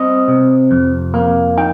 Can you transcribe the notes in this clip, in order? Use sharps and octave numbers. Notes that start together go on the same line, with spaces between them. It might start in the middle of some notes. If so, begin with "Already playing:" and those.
Already playing: G3 C4 D#5
C3
F2
A#3
D#4 G5